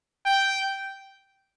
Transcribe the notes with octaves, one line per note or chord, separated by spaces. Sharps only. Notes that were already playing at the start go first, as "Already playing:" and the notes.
G5